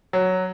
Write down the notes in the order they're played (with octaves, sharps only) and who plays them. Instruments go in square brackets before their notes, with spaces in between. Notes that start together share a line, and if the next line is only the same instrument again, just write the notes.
[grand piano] F#3